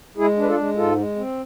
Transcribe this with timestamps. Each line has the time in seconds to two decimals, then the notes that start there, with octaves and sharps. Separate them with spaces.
0.17 G#3 E4 G#4
0.37 D4
0.42 B4
0.47 F4 A4
0.57 G#3
0.76 G#2 F4 A4
0.96 G#3
1.16 C4